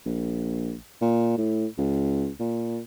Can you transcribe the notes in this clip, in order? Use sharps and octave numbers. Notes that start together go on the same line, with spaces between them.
A#1
A#2
A2
C#2
A#2